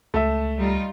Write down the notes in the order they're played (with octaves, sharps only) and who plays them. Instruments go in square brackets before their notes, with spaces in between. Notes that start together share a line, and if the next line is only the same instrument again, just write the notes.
[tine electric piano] C#2 [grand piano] A3 E5
[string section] G3 D#4 F4